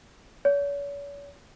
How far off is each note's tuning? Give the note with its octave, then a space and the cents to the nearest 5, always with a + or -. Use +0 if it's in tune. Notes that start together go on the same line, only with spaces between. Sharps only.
C#5 +40